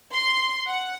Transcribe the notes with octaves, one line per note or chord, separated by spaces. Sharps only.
C6
F#5